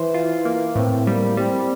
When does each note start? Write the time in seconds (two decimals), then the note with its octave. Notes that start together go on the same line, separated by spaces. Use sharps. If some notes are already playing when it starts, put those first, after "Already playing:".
Already playing: E3 C5
0.14 F4
0.45 A#3
0.75 A2 C4
1.06 G3 A#3
1.37 G3 C4